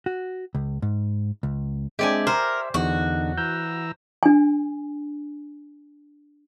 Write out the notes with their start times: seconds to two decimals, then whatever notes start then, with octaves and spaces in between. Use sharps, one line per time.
0.06 F#4
0.55 C#2
0.82 G#2
1.43 C#2
1.99 G#3 C4 D4 G4 D5 E5 G#5
2.27 A#4 C5 C6
2.74 E2 D3 D#4 F#4
3.38 E3 A#5 E6 G6
4.23 D4 G#5